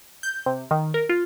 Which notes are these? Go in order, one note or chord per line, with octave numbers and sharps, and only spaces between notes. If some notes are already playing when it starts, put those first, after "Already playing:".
G6
C3
D#3
A#4
F4